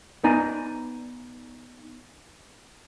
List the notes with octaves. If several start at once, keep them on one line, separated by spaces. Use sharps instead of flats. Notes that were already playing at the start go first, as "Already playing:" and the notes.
B3 D#4 D5 G#5 A#5